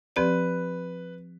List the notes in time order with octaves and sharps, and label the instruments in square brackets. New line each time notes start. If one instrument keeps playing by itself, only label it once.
[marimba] F3 C4 G4 D5 [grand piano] B4